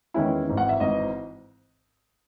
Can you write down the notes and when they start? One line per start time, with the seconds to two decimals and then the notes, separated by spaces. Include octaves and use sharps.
0.14 E2 D#3 G#3 C#4 E4
0.47 G#1 G#2 E3
0.57 F#5
0.69 E5
0.80 G#1 G#2 E3 D#5